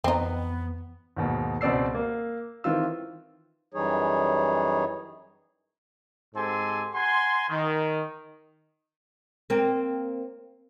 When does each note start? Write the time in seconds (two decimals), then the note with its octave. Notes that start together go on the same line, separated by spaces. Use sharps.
0.04 F2 E3 B3 C4 D#4
1.17 D#2 G#2 B2
1.61 C#2 B2 C4 D5 E6 C7
1.95 A#3
2.64 D#3 E3 C4 F4 E6
3.73 F#2 E3 G3 D#4 G#4 C#5
6.35 G#2 C4 G4 A4 G#5 C6
6.95 F#5 G#5 A#5 C6
7.49 D#3
9.50 A#3 C4